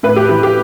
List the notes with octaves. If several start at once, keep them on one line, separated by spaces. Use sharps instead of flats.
A2 B4
G4
E3 G4
G4